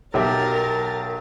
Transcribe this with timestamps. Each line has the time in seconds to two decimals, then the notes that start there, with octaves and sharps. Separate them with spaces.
0.14 B1 G4 A#4 E5 A6